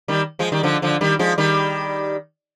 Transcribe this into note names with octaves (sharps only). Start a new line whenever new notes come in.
D#3 G3
F3 G#3
D#3 G3
D3 F3
D3 F3
D#3 G3
F3 G#3
D#3 G3